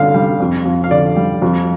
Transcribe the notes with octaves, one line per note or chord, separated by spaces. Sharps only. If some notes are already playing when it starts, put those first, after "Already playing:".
Already playing: G2 D3 F5
G3
F2
F2
F5
D3 D5
G3
F2